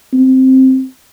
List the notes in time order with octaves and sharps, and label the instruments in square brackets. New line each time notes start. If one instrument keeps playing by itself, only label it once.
[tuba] C4